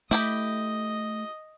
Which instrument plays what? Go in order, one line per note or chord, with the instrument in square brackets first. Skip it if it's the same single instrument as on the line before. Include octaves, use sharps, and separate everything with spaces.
[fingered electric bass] A3 [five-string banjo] E4 G4 B5 [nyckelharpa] D#5